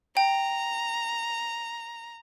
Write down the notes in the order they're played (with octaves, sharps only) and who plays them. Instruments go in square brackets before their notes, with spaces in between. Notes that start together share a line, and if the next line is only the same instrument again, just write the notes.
[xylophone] G5 [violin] A#5